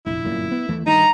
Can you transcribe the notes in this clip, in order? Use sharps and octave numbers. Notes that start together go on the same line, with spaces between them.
F1 A#1 E4
G1 F#2 A#2
B3
D#2 E3 A3
G2 D#3 D#4 A#5